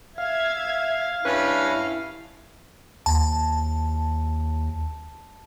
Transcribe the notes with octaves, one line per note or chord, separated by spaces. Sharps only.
E5 F5 G#6
G2 C#4 E4 B4
D#2 A5